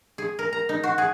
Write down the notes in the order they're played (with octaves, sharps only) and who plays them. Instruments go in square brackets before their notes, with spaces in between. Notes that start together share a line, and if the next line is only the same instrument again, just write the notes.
[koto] G#4
A#4
A#5
D#4
F#4
G#4